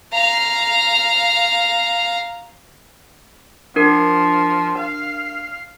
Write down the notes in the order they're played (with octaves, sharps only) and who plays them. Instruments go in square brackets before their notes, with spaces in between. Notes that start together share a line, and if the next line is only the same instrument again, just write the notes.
[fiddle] F5 A#5
[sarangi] F3 [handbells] D4 A#4
[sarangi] F5